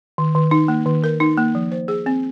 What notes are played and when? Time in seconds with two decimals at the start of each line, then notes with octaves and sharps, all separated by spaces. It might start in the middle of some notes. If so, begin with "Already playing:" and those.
0.18 D#3
0.35 D#3
0.51 D#4
0.68 A#3
0.86 D#3
1.04 A#4
1.20 D#4
1.37 A#3
1.55 F3
1.72 C5
1.88 G#4
2.06 C4